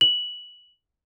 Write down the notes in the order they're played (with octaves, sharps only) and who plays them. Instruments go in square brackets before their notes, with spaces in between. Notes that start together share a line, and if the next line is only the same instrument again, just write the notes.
[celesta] F#7